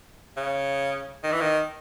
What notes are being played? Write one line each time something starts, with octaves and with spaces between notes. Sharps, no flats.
C#3
D#3
E3
D#3